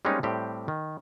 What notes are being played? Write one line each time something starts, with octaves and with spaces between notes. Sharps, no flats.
G3 G#3 A#3 C4 C#4 D#4
A2 G3 C4 G4
D#3